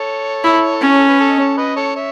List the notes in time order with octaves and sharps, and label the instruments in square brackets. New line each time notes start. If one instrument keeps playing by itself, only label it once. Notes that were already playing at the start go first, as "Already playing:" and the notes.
Already playing: [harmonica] A4 C#5
[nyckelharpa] E4
C#4
[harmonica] A4
B4
A4 C#5
D#5
A4 C#5
B4 D#5
A4 C#5
C#5 E5